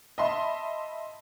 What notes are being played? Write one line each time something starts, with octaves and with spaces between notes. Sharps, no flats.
D#5 E5 A5 B5 C6